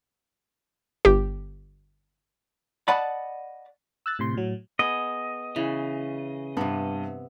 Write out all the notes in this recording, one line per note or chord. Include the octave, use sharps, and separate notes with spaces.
G1 G4
D5 D#5 F#5 A5 B5
E6 F#6 A6
A2 C3 C6
A2 F#3
B3 G#4 D#5
C#3 E3
G2 C3 B3